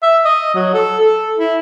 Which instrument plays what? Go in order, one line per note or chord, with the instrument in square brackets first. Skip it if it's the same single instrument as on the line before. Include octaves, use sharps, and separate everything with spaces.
[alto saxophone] E5
D#5
F#3
A4
A4
E4